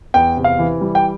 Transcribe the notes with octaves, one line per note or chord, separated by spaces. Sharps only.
E2 G5
C3
F5
E3
G3
G5